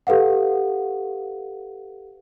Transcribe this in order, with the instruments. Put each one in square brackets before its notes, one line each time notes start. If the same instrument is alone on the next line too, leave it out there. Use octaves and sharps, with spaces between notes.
[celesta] G4 A4 B4 F5 F#5